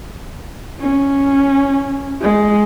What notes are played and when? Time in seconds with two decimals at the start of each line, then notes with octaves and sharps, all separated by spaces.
0.80 C#4
2.22 G#3